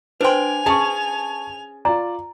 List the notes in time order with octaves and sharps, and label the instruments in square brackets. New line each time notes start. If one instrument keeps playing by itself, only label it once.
[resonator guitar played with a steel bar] D4 G5 [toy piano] B4 C5 C6 [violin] G#5 F7
[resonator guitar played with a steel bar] C#4 G#4 [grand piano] A5 C#6
[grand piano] F4 D5 [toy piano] A#5